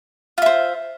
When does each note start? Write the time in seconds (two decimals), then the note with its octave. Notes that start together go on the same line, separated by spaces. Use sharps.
0.38 F4
0.42 E5
0.46 C5